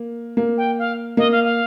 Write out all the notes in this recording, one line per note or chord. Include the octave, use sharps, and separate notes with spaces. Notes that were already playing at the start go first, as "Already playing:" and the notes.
Already playing: A#3
A#3
G5
F5
A#3 D#5
F5
F5